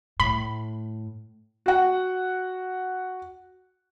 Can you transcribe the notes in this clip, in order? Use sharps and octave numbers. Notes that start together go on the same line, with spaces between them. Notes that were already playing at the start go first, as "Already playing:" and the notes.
A2 B5
F#4 F#5